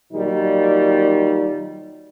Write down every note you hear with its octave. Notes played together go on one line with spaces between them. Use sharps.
A#2 D#3 F#3 G3 D#4